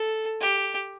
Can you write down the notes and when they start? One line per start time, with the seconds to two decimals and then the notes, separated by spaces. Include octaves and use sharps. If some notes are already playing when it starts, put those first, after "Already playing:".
Already playing: A4
0.41 G4